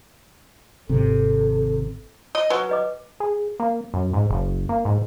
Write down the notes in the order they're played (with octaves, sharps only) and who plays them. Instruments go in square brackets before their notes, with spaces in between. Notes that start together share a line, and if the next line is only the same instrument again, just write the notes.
[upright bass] G#1 D#2 [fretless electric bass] C3 [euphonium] A4
[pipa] D#5
[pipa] F#3 [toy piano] B4 G#5
[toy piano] B4 D#5 D6
[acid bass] G#4
A#3
F#2
G#2
F#1
A#3
G#2